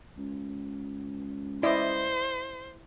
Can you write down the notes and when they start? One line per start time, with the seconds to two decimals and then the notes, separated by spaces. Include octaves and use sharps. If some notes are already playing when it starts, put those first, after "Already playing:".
0.17 C#2
1.63 E4 C5 D5 D#5